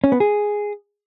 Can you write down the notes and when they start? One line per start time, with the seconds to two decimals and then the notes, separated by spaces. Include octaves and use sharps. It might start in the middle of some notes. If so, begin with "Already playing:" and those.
0.04 C#4
0.12 B3
0.20 G#4